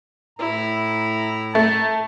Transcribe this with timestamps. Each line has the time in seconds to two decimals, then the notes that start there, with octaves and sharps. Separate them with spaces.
0.39 A2 E4 A#5
1.55 A3 A5